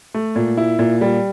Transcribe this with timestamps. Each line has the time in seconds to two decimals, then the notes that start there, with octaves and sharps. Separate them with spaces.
0.14 A3
0.36 A#2
0.57 E4
0.79 A#2
1.01 G3